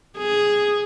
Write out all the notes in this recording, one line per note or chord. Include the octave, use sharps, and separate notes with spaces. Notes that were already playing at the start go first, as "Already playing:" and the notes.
G#4